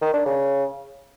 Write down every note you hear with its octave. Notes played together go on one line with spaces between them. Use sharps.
D#3
D4
C#3